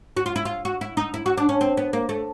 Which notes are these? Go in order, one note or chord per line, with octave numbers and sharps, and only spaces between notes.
F#4
F4
E4
F4
F#4
E4
D#4
E4
F#4
D4
C#4
C4
B3
A#3
A3